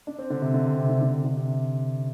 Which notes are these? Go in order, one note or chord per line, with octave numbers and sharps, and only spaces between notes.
D4
C4
D3
C3
D3
C3
C3
D3
D3
C3
D3
C3